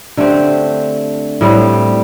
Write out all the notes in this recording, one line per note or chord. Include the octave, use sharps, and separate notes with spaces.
D3 A3 C4 G4
A2 G3 C4